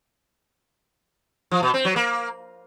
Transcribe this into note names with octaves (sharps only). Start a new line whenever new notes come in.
F3
B2
C4
F#3
A#3